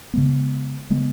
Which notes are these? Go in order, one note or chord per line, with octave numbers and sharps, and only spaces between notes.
C#3 G#3 B3
C#3 G#3 B3